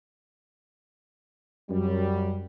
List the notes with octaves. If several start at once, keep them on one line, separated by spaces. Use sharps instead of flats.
F#2 G3